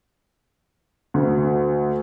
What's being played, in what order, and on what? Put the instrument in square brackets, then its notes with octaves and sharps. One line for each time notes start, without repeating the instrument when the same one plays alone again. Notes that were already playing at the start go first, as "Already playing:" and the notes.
[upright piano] D2